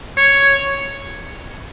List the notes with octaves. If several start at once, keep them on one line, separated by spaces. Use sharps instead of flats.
C#5